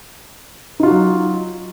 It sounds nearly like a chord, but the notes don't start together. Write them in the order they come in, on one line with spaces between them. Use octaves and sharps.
D#4 F4 F#4 F#3